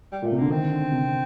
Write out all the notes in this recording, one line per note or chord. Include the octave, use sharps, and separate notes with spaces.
G3
A#2 A3
C3
D3 A#3
D#3 C4
D3
C3